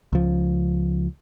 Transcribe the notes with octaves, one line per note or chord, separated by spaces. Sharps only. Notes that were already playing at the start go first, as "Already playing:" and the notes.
C#2 F3